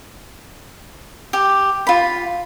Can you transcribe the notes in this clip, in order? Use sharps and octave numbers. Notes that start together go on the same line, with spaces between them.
G4
F4 B5